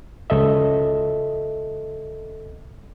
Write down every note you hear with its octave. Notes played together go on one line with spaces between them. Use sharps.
C#2 A4 D#5 E5